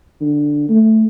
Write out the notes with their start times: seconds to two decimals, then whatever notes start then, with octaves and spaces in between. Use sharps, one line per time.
0.21 D3
0.69 A3